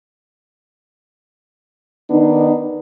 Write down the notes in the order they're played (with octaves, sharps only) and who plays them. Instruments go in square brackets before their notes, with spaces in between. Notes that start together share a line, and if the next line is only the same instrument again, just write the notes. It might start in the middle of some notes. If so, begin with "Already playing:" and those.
[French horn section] D#3 B3 D4 D#4